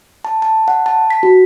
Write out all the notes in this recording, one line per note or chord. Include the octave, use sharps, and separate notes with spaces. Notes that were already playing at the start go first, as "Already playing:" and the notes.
A5
A5
F#5
A5
B6
F#4